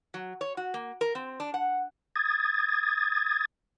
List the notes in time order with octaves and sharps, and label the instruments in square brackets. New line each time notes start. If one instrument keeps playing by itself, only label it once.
[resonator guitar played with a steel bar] F#3
C#5
F#4
A#3
A#4
C4
D4
F#5
[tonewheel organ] D#6 G#6 A6